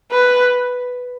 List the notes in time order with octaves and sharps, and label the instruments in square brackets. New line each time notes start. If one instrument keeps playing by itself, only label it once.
[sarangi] B4